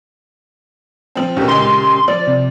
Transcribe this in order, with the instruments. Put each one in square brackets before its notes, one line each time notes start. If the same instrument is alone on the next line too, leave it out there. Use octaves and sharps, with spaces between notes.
[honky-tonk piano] F3 C4
[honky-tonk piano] D#2 B2 [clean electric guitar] C#4 G4 A#4
[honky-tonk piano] A#2 C#3 G#3 [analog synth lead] C6
[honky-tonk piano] F3 [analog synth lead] D5
[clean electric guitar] C3